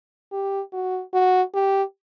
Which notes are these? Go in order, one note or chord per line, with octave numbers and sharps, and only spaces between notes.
G4
F#4
F#4
G4